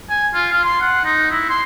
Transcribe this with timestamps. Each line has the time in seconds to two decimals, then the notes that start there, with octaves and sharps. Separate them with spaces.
0.10 G#5
0.34 F4
0.52 F4
0.64 C6
0.81 F#5
1.04 D#4
1.31 E4
1.49 C6